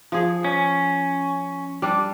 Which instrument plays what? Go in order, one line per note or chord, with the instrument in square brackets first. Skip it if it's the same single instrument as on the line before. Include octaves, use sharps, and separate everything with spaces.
[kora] F3 G#4
[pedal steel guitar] C#4
[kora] G3 D4